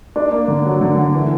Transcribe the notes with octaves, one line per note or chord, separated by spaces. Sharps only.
D4
A#3
D3
F#3
D3
D3
E3